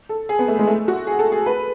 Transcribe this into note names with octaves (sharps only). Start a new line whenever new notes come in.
A4
G#4
B3
A3
G#3
A3
F#4
G#4
A4
G#4
B4